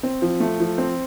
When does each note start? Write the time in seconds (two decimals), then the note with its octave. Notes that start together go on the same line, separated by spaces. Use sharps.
0.03 C4
0.22 F3
0.40 A3
0.60 F3
0.78 C4